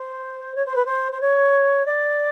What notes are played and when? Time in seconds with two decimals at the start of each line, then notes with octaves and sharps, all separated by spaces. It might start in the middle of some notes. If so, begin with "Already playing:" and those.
Already playing: C5
0.55 C#5
0.65 C5
0.75 B4
0.85 C5
1.12 C5
1.20 C#5
1.85 D5